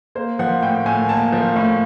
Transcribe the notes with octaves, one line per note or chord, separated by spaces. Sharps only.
A#3 C5
F3 F#5
A2 G5
A2 G#5
A#3 A5
F3
A2